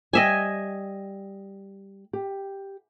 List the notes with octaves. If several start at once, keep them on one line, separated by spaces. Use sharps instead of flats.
G3 D#5 E5 G5 G#5
G4